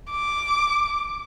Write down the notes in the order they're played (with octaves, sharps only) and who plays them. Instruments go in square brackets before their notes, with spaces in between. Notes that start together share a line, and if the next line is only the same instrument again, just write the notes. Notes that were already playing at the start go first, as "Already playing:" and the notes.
[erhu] D6